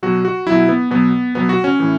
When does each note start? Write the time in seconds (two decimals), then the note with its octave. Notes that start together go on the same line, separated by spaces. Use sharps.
0.03 B2 F#3 F#4
0.25 F#4
0.47 B2 F#3 E4
0.68 B3
0.91 B2 F#3 B3
1.35 B2 F#3 B3
1.49 F#4
1.64 C#4
1.79 A2 E3